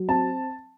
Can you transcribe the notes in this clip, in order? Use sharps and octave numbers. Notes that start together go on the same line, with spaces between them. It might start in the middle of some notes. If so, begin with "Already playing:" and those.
Already playing: F#3
C4 A5